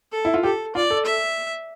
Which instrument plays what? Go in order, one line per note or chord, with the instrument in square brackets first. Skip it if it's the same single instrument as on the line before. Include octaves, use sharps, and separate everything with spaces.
[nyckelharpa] A4
[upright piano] E4
F4
[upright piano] G4 [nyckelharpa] A4
[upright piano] F4 [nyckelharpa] D5
[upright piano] A4
[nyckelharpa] E5